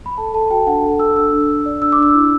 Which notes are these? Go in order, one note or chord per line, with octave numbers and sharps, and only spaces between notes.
B5
A4 A5
A4 A5
F#4 G5
D4 F#5
A4
A4 E6
D4 E6
D4
D4
D5
D4 E6
D6
D4 E6
E4